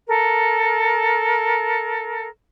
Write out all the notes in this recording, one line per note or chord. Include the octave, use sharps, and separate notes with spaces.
A4 A#4